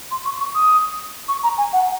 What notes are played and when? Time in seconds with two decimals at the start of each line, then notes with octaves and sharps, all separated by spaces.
0.11 C6
0.25 C#6
0.40 C#6
0.55 D#6
1.28 C#6
1.43 A#5
1.58 G#5
1.73 F#5